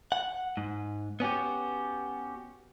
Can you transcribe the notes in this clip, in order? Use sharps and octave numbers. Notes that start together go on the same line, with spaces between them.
F#5
G#2
B3 C#4 F#4 G4